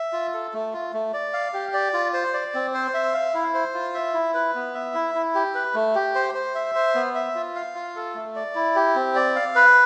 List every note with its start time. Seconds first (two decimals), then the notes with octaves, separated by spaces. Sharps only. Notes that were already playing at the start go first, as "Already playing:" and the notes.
Already playing: E5
0.13 F4
0.34 A4
0.54 A3
0.73 F4
0.93 A3
1.14 D5
1.33 F5
1.54 G4
1.74 D5
1.93 F4
2.14 C5
2.34 D5
2.54 C4
2.74 C5
2.94 E5
3.14 F5
3.34 E4
3.54 C5
3.74 F4
3.94 E5
4.14 E4
4.34 B4
4.55 B3
4.74 E5
4.94 E4
5.15 E4
5.35 G4
5.55 B4
5.74 A3
5.95 G4
6.15 C5
6.35 C5
6.55 E5
6.75 C5
6.95 B3
7.15 E5
7.35 F4
7.55 F5
7.75 F4
7.96 A4
8.15 A3
8.35 D5
8.55 E4
8.76 G4
8.96 C4
9.15 D5
9.36 F5
9.55 B4